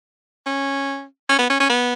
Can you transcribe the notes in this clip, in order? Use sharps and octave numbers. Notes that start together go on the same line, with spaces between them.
C#4
C#4
B3
C#4
C#4
B3